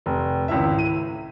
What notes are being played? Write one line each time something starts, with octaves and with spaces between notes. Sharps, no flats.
F1
G#1 C#2 E4 E5
A2 D#7